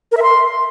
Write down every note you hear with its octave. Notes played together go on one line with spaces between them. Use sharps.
A#4
E5
C6